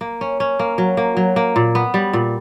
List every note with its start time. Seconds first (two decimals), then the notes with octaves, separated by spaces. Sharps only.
0.01 A#3
0.21 C#4
0.40 C#4
0.59 A#3
0.78 F#3
0.97 A#3
1.17 F#3
1.36 A#3
1.56 A#2
1.75 B3
1.94 G3
2.13 A#2